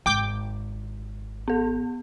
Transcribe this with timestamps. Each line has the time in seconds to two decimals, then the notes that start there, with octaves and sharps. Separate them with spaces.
0.06 G#1 G5 D6 G6
1.48 B3 A4